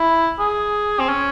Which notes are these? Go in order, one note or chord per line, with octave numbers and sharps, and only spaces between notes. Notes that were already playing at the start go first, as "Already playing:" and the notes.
Already playing: E4
G#4
C4
C#4